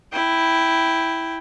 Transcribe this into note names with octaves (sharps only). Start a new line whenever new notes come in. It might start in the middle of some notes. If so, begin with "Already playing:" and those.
E4 G5